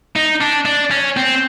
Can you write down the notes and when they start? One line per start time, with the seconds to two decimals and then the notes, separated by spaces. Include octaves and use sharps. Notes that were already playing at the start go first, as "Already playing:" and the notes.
0.16 D#4
0.41 D4
0.65 D4
0.91 C#4
1.17 C4